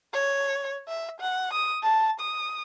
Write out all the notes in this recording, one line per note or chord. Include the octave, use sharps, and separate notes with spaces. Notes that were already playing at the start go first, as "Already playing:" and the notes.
C#5
E5
F#5
D#6
A5
D#6